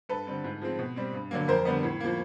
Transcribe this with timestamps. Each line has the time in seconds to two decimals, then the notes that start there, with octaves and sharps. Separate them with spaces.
0.09 G2 A4 B4
0.27 D3 G3 C4
0.44 G#2
0.62 F3 G#3 C4
0.79 B2
0.96 G3 C4
1.13 G2
1.31 D3 F#3 A#3
1.48 F2 A#4 C5
1.65 D3 G3 B3
1.83 A2
2.00 F3 A#3